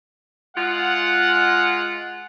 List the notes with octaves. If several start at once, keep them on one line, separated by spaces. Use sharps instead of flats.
G#3 F4 F#5